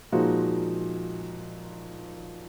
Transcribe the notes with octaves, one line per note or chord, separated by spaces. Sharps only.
A#2 F3 G#3 D#4 F#4